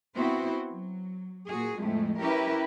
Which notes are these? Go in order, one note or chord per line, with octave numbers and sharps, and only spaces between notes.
B3 C4 E4 F#4 C5
F#3
A#2 F#4 G#4
F2 A2 G#3 A3
C#4 E4 G4 A#4 B4